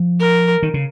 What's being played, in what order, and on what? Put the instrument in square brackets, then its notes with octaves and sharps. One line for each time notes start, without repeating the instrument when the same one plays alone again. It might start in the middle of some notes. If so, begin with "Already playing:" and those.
Already playing: [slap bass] F3
[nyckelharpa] A#4
[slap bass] D#3
C#3